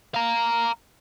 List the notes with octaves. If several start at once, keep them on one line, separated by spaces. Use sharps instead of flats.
F5 A#5